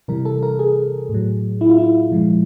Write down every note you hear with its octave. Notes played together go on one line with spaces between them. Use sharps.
C3 E3 G3 A#4
A4
A#4
G#4
A2 F#3
E4
F4
E4
A#2 F3 G#3